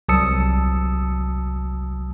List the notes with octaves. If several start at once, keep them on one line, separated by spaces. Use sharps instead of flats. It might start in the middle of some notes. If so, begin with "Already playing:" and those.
C2 F#3 A5 D#6 E6 C#7